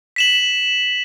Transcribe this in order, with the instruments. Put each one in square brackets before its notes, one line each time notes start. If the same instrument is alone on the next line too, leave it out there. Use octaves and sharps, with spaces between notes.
[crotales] B6 E7 F#7